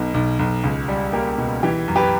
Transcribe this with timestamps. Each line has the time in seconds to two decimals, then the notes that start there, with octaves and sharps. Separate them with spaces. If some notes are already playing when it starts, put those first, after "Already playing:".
Already playing: B1 B2
0.14 B1
0.39 B1
0.64 C#2
0.88 G3
1.13 A#3 G4
1.38 B2
1.63 E3 G4
1.88 F#2
1.96 G4 B4